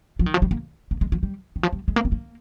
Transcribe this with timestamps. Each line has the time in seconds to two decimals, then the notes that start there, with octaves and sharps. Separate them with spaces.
0.19 F3
0.26 D#3
0.34 F3
0.42 G3
0.51 A#3
0.91 A#3
1.01 G#3
1.12 F3
1.23 G3
1.56 D#3
1.63 F3
1.73 G3
1.88 G#3
1.96 A#3
2.05 C4
2.12 A#3